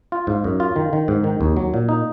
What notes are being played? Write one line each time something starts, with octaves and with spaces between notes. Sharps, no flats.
F4
G#2
F#2
F4
D#3
D#3
G#2
D#3
D#2
F#3
A#2
D#4